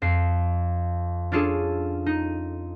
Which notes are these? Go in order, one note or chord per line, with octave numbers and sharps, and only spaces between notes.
F2 C7
C#4 D4 F4 G#4 A4
D#4